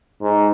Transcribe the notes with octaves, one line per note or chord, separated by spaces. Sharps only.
G#2